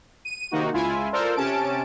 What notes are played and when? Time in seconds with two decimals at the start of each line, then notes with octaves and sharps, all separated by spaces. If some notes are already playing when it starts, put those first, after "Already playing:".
0.25 D#7
0.51 C3 D#3 A#3 D#4 F#4
0.73 C#2 E4 F4 G#5
1.13 F4 A4 A#4 C5 D5
1.35 C3 C#4 A5 D7